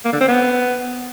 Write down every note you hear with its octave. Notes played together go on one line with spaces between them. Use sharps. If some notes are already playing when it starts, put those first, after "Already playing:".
A#3
D3
C4
B3